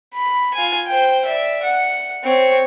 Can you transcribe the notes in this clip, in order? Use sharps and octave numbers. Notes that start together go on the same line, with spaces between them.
B5
F4 G#5
C5 G5
D5 E5
F#5
C4 C#5